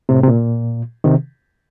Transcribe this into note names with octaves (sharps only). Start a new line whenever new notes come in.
A2 C3
C3
A#2
C3 D#3